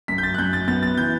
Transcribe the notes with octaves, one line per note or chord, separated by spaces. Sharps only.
F#2 B6
G6
A6
F#6
F#2 G6
A6
B3 A6
A6
E3 G6